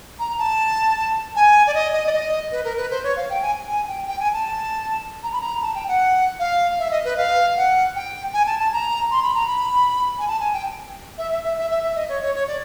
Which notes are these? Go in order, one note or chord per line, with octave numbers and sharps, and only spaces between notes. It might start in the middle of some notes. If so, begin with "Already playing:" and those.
A#5
A5
G#5
D5
D#5
D#5
D5
D#5
B4
A#4
B4
C5
C#5
F5
G5
G#5
G#5
G5
G5
G#5
A5
A#5
B5
A#5
A5
G5
F#5
F5
E5
D#5
B4
F5
F#5
G5
G#5
A5
A5
A#5
C6
B5
A#5
B5
G#5
A5
G#5
G5
E5
E5
E5
E5
E5
E5
D#5
C#5
C#5
C#5
D5